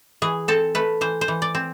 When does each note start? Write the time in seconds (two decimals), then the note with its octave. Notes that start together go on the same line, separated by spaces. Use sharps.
0.22 E3 G#4
0.48 C4 A4
0.75 A3 B4
1.01 E3 C5
1.21 C5
1.28 E3
1.42 D5
1.55 C4